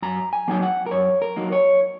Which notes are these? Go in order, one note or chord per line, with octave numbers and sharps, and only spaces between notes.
F#2 A#5
G#5
F#3 A#3 D#4 G#5
F#5
A#4
F#2 C#5
A#4
F#3 A#3 D#4
C#5